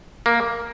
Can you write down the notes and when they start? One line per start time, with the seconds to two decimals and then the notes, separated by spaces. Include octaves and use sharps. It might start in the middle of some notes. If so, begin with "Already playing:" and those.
0.26 A#3